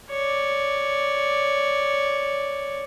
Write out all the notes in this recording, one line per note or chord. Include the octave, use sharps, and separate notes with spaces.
C#5 D5